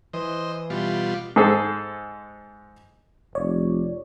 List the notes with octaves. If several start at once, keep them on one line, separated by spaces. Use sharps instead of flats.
E3 C5 D#5
B2 G3 F4
G#2 G#4 A4 C5
F1 C#5 D5